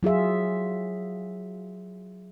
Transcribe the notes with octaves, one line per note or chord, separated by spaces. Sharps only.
F#3 F4 G#4 E5